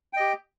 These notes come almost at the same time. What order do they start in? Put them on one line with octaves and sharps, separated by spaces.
G5 D#5 G4